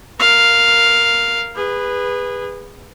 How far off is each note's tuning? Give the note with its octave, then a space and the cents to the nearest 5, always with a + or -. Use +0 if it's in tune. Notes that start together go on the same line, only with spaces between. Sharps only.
A#4 +0 F5 +0
G#4 -25 B4 +0